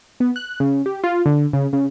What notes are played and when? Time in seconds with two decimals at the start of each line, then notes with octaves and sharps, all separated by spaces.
0.20 B3
0.36 F#6
0.60 C#3
0.86 G4
1.04 F4
1.26 D3
1.53 C#3
1.73 C#3